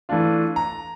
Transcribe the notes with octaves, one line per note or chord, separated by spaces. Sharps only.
E3 A3 D4 F4
A#5